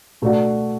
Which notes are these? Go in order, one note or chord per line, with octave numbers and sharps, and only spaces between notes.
B2 A3 D4 F#4